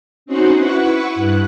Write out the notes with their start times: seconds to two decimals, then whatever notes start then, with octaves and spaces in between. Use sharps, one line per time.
0.26 C4 C#4 D#4 F#4 C5 F#5
0.56 E4 B4 F#5 C#6
1.15 G2 F#6